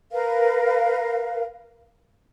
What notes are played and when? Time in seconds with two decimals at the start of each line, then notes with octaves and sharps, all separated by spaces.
0.12 A#4 B4 F5